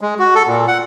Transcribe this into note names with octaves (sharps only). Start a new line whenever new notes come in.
G#3
F#4
A4
A#2
F#5